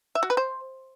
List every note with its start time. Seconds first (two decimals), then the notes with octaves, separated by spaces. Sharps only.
0.15 E5
0.23 F#4
0.30 B4
0.37 C5